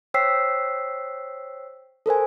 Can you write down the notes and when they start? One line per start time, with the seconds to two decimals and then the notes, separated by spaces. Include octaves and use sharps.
0.14 C5 C#5 G5 E6 B6 C7
2.06 A4 A#4 C5 G#5